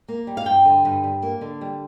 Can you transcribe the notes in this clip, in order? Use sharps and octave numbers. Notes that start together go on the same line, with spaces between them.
A#3
G3
F5
G2 G5
D3
G2
G3
A#3
D3
G3